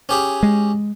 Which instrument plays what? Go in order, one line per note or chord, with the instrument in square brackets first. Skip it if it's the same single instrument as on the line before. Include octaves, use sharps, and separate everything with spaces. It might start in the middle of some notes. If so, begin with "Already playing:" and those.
[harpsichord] C#4 G4 G#4
[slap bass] G#3